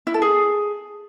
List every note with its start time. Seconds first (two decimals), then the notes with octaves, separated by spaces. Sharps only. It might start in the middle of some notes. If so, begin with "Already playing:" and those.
0.07 E4
0.14 A4
0.22 G#4